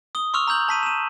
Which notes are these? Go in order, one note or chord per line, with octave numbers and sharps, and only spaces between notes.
D#6 G7
C6 C#6 E6 F6 F7
A#5 E6 G6 F#7
A5 B6 D#7
D#7 E7